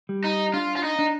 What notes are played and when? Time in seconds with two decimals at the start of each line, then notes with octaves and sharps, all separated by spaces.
0.09 G3
0.24 D#4
0.54 D4 F4
0.76 F4
0.84 D#4
0.99 D4